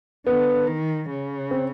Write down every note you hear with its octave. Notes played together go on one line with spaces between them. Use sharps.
D3 B3
D#3
C#3
C4